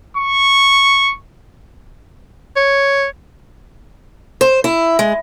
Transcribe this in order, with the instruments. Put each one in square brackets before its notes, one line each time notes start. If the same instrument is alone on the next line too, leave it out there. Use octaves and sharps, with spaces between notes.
[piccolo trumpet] C#6
[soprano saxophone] C#5
[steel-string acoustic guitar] C5
E4
G#3